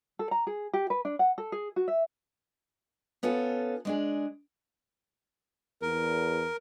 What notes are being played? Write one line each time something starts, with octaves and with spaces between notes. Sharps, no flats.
A4
A#5
G#4
G4
B4
D4
F#5
A4
G#4
F#4
E5
B3 C#4 F4 A4
G#3 D4 G#4
E2 A#4